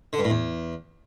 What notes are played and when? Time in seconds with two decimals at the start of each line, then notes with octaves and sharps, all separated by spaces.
0.13 D3
0.19 G2
0.24 A2
0.30 E2